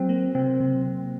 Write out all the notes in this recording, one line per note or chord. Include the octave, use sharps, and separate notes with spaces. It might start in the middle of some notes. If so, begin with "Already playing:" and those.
Already playing: F#3 C4
A#3
C3 C4
C3